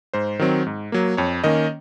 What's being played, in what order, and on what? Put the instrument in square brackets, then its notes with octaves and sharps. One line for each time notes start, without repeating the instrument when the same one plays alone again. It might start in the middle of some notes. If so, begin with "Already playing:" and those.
[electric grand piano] G#2 C5
D#3 F#3 C4
G#2
F#3 A#3
F2 C#5
D#3 A#3 C#4 D#5